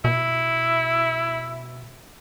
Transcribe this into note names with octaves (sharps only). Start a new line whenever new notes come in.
B2 E4